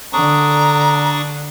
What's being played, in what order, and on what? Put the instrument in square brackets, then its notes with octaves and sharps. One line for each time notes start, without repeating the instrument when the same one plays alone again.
[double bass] D3 [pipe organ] D4 C#6 D#6 [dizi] A#5